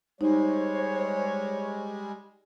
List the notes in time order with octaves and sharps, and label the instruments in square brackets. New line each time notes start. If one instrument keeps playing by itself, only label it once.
[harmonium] G3 G#3 [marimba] D#4 [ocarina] C5 [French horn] C#5